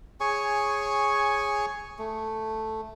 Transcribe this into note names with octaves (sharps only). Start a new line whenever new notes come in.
G#4 C#5 G#5 C#6
A3